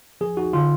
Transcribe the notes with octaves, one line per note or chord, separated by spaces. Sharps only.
F3 G#4
D#4 F#4
D3 F4